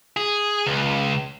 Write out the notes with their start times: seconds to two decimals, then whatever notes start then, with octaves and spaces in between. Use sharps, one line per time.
0.17 G#4
0.66 C#2